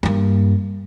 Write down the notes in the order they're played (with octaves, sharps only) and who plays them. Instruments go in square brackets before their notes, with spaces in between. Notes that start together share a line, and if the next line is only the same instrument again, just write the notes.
[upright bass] G2 A#3